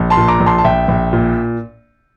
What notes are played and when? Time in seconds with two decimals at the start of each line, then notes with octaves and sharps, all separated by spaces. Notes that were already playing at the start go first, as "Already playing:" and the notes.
Already playing: A#1
0.10 A5 C6
0.17 A#2
0.28 A#5 D6
0.40 A#1
0.46 A5 C6
0.58 A5
0.64 A#1 E5 G5
0.88 A#1
1.13 A#2